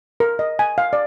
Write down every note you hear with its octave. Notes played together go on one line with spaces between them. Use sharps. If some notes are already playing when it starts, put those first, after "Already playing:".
A#4
D#5
G#5
F5
D5